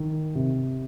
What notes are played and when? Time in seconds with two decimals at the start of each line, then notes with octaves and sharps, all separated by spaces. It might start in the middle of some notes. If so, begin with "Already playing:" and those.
Already playing: D#3
0.35 C3